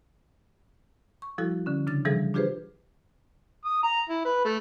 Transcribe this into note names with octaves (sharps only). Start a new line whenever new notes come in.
C#6
F3 G3 E4 F#4 A4
D3 C#4
C#3 D4 A6
C3 E3 F3 G3 G#4 A4
D4 F4 G4 G#4 B4 C5
D#6
A#5
E4
B4
A3